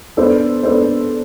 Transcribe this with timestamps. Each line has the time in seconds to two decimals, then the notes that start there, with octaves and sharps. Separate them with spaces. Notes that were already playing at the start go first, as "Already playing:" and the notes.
0.17 B3 D4 A4 C5
0.63 B3 D4 A4 C5